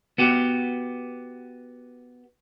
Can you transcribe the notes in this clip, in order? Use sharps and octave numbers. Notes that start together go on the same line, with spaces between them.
B3 F#4 G4